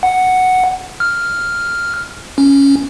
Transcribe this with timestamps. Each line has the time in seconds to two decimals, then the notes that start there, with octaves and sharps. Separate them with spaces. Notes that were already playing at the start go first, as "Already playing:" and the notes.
0.03 F#5
1.00 F6
2.38 C#4